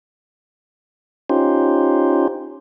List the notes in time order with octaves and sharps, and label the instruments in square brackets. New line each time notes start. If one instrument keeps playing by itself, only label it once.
[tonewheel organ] C#4 D#4 F4 G4 C5